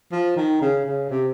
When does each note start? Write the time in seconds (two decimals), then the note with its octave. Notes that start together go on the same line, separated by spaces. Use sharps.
0.12 F3
0.36 D#3
0.61 C#3
0.85 C#3
1.09 C3